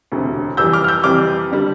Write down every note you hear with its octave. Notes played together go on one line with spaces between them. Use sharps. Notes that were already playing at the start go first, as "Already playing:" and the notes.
E1 D2 C3
F2 C3 E3 G3 E6 G6
D6 F6
F6
E6 G6
F2 C3 E3 G3 D6 F6
D3 G3